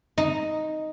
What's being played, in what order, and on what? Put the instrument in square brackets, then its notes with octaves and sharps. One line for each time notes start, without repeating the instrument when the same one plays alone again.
[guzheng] D#4